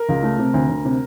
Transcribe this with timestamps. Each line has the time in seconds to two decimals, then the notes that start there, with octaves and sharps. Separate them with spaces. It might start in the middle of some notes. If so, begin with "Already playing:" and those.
Already playing: A#4
0.09 C#2
0.23 A3
0.39 C3
0.54 D2
0.69 D2
0.85 C3